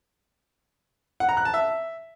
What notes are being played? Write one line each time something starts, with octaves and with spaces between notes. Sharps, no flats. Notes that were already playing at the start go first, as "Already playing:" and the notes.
F#5
A#5
F#6
A5
E5